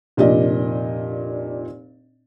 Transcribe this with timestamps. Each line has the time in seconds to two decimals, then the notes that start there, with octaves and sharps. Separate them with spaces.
0.17 F1 A#2 D4 G4 A#4 D#5